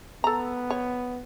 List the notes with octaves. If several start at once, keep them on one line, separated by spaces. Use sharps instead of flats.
B3 A4 A#5
C#5